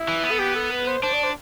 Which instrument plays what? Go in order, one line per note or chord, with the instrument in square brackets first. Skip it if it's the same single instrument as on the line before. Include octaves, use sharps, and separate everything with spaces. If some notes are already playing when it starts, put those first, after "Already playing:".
Already playing: [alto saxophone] E4
[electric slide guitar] E3
B3
[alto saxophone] A4
G4
A4
B4
C5
[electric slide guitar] D4 [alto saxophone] C5
[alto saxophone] D5
C5